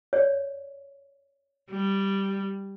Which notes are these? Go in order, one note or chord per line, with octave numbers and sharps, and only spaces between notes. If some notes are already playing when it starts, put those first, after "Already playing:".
C#5 D5
G3